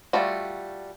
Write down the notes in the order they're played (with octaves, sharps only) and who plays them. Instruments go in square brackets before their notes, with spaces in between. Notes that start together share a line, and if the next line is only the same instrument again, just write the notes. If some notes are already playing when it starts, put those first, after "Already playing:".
[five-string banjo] G3 A3 F4 F#4